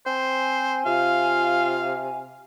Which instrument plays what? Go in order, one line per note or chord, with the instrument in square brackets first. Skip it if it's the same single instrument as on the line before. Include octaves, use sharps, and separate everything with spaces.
[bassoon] C4 [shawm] C5 [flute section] G#5
[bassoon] C3 [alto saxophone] F4 [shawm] F5